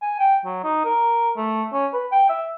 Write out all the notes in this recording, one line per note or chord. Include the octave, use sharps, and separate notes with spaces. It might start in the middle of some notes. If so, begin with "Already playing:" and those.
G#5
G5
F#3
D#4
A#4
A3
C#4
B4
G5
E5